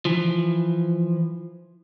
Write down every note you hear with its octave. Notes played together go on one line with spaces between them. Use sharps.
E3 F3